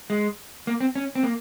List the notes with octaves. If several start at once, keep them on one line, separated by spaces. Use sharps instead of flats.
G#3
A#3
C4
C#4
C4
A#3